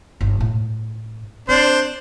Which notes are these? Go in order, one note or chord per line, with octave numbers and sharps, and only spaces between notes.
G1 D#4
A2
C4 D4 C5